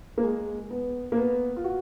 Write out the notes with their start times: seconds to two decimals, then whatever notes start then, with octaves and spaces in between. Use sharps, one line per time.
0.18 A#3
0.23 G#3
0.70 B3
1.12 A#3
1.17 B3
1.56 F4
1.64 F#4